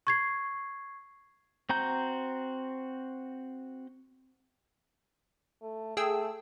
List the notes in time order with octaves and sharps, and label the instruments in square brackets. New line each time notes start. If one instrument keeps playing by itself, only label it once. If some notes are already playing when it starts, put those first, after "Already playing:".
[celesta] C#6 G#6 C7
[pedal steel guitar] C4 F#4 A#5 G6
[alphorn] A3
[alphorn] A3 [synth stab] G#4 G5 E6